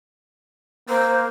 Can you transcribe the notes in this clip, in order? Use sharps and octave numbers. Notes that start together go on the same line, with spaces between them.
A#3 C5